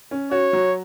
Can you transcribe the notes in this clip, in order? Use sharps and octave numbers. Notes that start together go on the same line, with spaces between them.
C#4
F#4 C#5
F#3